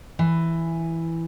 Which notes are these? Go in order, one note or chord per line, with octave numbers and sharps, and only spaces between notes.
E3